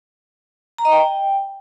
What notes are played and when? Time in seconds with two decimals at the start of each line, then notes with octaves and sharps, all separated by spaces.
0.78 A#5
0.85 D#5
0.92 G5